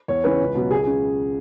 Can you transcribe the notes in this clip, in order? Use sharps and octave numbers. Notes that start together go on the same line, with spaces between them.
E2 C#5
C#3 E3 B4
C#2
B2 F#3
C#2 G#4
G#4
C#3